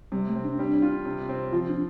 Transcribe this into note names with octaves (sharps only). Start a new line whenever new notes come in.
C3 G3
A3
C4
D4
G3 D4
F4
C3
C4
F3 F4
D4